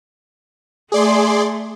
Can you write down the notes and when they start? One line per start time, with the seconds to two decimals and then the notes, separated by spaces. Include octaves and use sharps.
0.92 A3 G#4 D5 C6